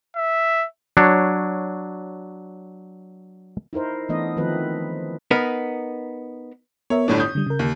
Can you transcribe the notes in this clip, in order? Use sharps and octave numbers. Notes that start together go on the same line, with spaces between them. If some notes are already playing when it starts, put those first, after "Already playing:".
E5
F#3 D4 C#5
D#4 E4 A#4 C5
E3 A3 B3 D4 D#5
D#3 F3 A3 C4 B4
B3 D#4 A#4
B3 A#4 C#5 E5
G1 A2 D4 C#5
D#6 G6
D3 G3
C#3 A#4
D#2